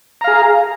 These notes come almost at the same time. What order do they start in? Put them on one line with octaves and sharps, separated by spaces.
A#5 F5 G#4